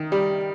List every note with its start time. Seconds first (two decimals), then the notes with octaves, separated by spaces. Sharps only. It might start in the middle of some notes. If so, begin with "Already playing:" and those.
Already playing: D#3
0.12 G3